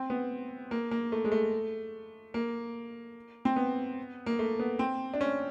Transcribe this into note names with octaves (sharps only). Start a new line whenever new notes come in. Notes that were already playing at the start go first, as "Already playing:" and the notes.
Already playing: C4
B3
A#3
A#3
A3
G#3
A3
A#3
C4
B3
A#3
A3
B3
C4
D4
C#4